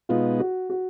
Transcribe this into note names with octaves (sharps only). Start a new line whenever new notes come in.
B2 G#3 B3 D#4 F4
F#4
F#4